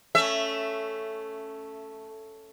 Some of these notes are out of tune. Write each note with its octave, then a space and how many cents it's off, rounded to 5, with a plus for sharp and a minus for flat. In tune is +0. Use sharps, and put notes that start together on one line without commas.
A3 +0 C#4 +5 E5 +15